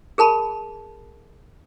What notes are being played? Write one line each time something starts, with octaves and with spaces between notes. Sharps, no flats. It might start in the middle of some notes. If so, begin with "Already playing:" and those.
G#4 A#4 A5 B5